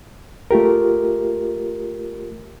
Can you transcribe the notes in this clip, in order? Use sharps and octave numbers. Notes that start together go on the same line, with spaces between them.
A3 F4 G4 A#4